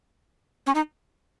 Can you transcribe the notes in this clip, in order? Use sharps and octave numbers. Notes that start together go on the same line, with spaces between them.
C#4
D#4